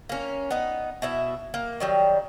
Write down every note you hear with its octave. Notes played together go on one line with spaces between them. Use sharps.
A#3 C#4
B3 D#4
B2 E4 E5
A#3
D#3 F#3 G3